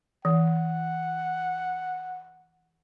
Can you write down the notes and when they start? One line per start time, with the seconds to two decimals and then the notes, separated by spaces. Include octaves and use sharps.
0.25 E3 F#5